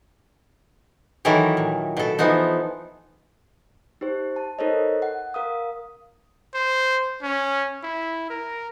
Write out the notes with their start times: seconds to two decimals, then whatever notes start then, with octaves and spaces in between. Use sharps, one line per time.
1.25 D#3 E3 F#3 E4 A4 A#4
1.57 A#2
1.97 B2 A4
2.19 E3 F3 B3 D#4
4.01 D#4 G4 C5
4.36 A5
4.59 D#4 A4 A#4 C5 C#5 D#5
5.02 F#5
5.34 A#4 F5 D#6
6.54 C5
7.23 C#4
7.83 E4
8.30 A#4